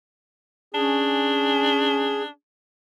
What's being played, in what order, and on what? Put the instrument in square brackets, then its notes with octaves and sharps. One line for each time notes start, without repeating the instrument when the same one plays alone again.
[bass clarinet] C#4 [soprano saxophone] D4 [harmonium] G#4